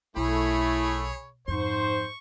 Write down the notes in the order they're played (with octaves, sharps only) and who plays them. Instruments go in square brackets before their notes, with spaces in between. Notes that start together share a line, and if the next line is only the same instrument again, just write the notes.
[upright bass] B1 [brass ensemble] A3 [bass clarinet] E4 [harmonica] G#4 C#5 B5
[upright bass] F2 [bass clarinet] G#2 [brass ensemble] C5 [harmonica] C#6